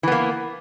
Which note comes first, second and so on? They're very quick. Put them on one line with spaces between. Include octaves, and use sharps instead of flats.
E3 B3 A#3